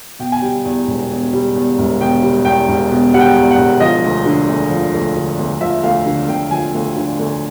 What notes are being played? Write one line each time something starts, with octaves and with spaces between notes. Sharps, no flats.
B2 G5
G#5
G3 G5
E2
E1
B2
G3
E2
E1
B2 G5
G3
E2 G5
E1
B2
G3 F#5
G5
E2
F#5
E1
F3 D#5
D2
D3
D2
F3
D2
D3
D2
F3 E5
D2 F5
D3
D2 G5
F3 G#5
D2
D3
D2